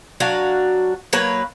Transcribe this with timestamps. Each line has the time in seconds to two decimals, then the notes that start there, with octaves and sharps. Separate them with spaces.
0.20 F#3 D4 F#4 F5
1.13 F#3 A#3 B4 C#5